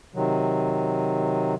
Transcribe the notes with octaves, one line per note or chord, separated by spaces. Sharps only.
C3 D#3 F#3